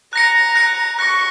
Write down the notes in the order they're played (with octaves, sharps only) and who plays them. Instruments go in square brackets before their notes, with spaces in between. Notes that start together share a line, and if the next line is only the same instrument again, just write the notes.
[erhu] A#5 [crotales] F#6 A#6 C#7
[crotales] F#6 A#6 C#7
[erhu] C#6 [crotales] F#6 A#6 C#7